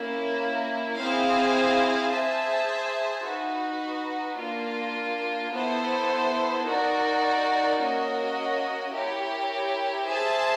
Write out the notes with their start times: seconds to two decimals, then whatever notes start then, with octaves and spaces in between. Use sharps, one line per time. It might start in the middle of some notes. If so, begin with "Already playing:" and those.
Already playing: A#3 C#4 E4
0.98 C4 E4 G#4 C5 F5
2.11 G#4 C5 E5 A5
3.24 D#4 F#4 B4
4.39 A#3 D4 F4
5.52 B3 E4 A4 C5
6.66 D#4 F#4 A#4 D5
7.79 A#3 C#4 F#4 A#4 D#5
8.93 E4 G4 A#4 C#5
10.07 G#4 C5 E5 A5